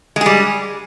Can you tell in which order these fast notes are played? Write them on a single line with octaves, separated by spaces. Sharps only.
G#3 G#4 G3